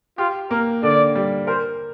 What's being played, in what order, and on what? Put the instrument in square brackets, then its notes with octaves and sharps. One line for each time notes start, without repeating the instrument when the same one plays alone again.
[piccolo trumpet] F4 [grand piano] G4
[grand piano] A#3 [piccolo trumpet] A#4
[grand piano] D3 [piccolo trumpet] D5
[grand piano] G3
[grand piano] A#4 [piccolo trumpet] C5